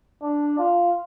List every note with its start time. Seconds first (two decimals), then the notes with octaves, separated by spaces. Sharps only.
0.22 D4
0.58 F4